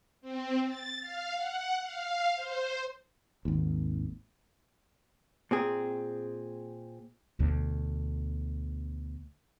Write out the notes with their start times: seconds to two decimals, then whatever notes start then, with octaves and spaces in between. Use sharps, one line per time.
0.21 C4
0.67 A6
1.01 F5
1.35 F#5
1.83 F5
2.35 C5
3.45 G#1 D#2
5.51 A#2 C4 G#4
7.39 D2 B2